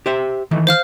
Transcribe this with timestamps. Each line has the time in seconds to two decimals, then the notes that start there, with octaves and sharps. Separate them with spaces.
0.06 G4 C5 E5
0.51 D#3 E3 A3
0.67 C5 F5 F6